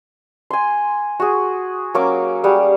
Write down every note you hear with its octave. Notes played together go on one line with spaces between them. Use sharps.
G#5 C6
F#4 G#4
F#3 A#3 C#4 D6
G3 G#4 F#5